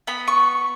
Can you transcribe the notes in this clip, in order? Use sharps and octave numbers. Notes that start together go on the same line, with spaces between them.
B3 B5
C#6